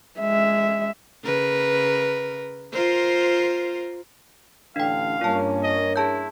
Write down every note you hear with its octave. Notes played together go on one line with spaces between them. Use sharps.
G#3 E5
C#3 A#4 B4
F4 A#4 C5
A1 D3 D4 F5 G5
G2 A#3 C#4 D4 F4 A#4 C#5 A5
D#5
E4 G#4 A5 G6